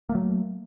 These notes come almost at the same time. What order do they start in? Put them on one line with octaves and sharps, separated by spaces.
A#3 A3 F#3